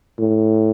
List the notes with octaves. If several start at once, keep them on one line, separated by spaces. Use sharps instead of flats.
A2